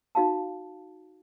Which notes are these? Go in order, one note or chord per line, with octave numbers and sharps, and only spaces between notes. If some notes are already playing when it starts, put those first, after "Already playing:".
D#4 F#4 F5 A5